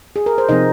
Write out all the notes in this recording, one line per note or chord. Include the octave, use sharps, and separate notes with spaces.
G#4
A#4
C5
C3 F3 C4 D#4 D#5